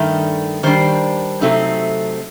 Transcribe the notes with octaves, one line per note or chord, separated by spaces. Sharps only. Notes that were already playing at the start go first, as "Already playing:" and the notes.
Already playing: G2 D#3 A3 D#4
D#3 G3 D4 C5
C3 F#3 A3 C4 D#4